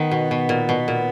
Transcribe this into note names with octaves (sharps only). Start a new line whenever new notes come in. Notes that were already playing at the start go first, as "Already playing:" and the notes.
Already playing: D#3 B3
B2
B2
A#2
B2
A#2